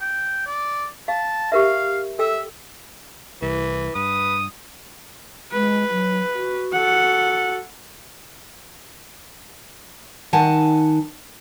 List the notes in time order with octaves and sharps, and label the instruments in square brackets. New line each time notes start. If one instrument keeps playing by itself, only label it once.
[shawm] G5
D5
[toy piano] F5 [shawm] A5
[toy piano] G4 A#4 E5 [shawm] F5
[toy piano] A4 G5 E6 [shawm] E5
[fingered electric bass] C2 [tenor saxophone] E3
[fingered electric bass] G2 [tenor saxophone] B4 [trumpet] D#6
[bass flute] G#3 [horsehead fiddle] B4
[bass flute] F#3
F#4
[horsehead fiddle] A4 F#5
[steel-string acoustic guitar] D#3 D#4 F#5 G#5 A5